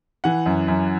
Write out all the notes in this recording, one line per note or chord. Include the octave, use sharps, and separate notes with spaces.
E3 F#5
F#2
F#2